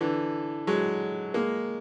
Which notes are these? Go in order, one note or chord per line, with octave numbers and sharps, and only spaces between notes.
D3 E3
F#3 G#3
G#3 A#3